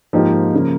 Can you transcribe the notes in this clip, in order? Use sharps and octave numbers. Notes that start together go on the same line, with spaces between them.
G#2 F3 A#3 D#4 G4
C#3 F3 A#3